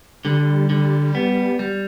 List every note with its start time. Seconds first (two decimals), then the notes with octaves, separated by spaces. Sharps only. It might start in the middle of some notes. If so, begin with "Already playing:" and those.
0.25 D3 G3
0.70 D3
1.15 B3
1.59 G3